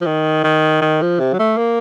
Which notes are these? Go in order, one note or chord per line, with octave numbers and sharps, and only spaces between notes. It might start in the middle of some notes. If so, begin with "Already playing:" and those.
F3
D#3
D#3
D#3
F3
C3
F#3
A3
A#3